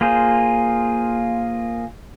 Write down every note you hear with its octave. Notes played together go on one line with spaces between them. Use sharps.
A#3 F4 G#4 C5